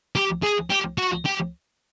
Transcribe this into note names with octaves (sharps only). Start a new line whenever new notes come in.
G4
G#4
G4
F#4
G4